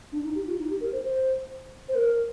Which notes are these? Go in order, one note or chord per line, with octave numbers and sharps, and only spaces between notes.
D4
D#4
G4
F4
D#4
G4
A#4
C5
C5
C5
A#4